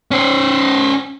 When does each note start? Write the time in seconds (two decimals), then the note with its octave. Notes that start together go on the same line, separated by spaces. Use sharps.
0.11 C#4 C5